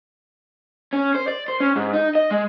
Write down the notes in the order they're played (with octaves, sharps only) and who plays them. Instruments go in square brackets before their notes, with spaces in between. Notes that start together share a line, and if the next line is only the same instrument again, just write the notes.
[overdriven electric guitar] C#4
C5
D5
C5
C#4
G#2
D#4
D#5
G#3